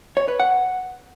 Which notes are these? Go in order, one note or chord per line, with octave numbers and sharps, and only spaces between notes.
C#5
B4
F#5